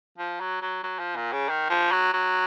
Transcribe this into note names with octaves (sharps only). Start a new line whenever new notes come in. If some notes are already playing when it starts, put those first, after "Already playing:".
F3
F#3
F#3
F#3
F3
A#2
C#3
D#3
F3
F#3
F#3